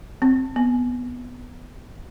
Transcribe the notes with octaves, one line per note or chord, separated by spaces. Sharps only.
C4
B3